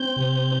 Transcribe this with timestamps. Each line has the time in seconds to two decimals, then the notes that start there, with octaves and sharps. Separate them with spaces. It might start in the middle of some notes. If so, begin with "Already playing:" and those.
Already playing: C4 G6
0.16 C3